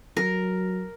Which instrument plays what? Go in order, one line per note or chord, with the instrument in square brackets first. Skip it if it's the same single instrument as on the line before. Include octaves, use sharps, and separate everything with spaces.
[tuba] F#3 [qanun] A#4